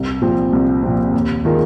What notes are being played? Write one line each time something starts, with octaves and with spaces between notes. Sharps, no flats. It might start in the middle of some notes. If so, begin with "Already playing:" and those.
Already playing: C2
A#2 F3 C4
C2
A#2 F3 C4
D#2
D#3 G#3 F4 A#4